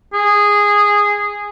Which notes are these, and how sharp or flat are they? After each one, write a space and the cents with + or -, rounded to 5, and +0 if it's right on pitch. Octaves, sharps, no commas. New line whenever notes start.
G#4 -10